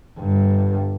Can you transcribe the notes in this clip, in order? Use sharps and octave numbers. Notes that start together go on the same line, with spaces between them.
G1 G2